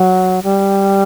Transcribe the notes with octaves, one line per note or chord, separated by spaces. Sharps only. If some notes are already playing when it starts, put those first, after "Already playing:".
Already playing: F#3
G3